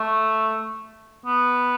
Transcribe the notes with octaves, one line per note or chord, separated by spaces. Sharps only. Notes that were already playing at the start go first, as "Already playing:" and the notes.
Already playing: A3
B3